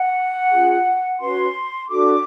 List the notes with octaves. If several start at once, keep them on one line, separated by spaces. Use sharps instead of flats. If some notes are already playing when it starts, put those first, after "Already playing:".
Already playing: F#5
C#4 F4 G#4
C#4 F#4 B4 C6
D4 F#4 A4 D6